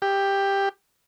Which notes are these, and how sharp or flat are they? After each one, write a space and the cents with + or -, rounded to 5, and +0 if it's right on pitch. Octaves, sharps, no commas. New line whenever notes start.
G4 +10